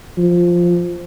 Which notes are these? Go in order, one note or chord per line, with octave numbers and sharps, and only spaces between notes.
F3